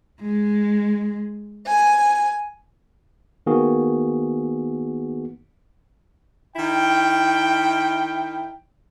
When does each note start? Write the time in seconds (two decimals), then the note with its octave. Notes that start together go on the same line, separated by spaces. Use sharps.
0.21 G#3
1.67 G#5
3.46 D#3 A#3 B3 F#4 G#4
6.56 D#3 E4 G5